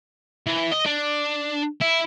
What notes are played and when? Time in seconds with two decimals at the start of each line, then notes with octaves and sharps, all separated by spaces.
0.46 E3
0.72 D#5
0.86 D4
1.81 E4